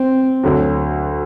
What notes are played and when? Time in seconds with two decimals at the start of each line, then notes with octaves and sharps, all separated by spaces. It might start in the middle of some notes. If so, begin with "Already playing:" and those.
Already playing: C4
0.44 D2 D3 F#3